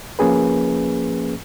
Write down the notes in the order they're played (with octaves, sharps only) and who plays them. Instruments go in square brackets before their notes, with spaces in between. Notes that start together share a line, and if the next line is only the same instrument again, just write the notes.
[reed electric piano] F3 A#3 C#4 G#4 B4